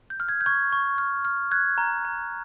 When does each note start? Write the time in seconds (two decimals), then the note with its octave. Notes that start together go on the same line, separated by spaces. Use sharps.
0.10 G6
0.20 F6
0.29 G#6
0.41 G6
0.46 C#6 G#6
0.73 C#6
0.98 F6
1.25 F6
1.51 F#6 G#6
1.78 A#5
2.05 A#5